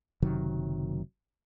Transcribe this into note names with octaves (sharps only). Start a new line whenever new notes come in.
F#1 C3 D#3 F#3